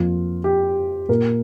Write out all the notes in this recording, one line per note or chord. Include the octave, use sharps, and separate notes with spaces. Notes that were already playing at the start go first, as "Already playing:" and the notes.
Already playing: F2 F3 A#3 F4
G4
A#2 A#3 A#4